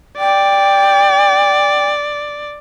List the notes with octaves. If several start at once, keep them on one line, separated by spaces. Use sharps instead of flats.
D5 G5